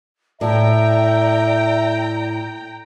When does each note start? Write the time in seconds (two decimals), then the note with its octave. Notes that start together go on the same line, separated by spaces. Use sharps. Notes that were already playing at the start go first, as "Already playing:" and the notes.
0.41 A2 D5 E5 G5 A#5